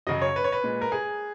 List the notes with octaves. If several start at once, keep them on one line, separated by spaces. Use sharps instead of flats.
F#2 C#3 F#3 D#5
C#5
B4
C#5
B4
A#2 G#3
A#4
G#4